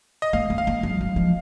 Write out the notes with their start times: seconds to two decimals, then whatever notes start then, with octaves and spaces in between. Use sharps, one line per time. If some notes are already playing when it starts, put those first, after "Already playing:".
0.22 D#5
0.33 A#3 F5
0.50 A#3
0.58 F5
0.67 A#3
0.83 F#3
1.01 F#3
1.16 F3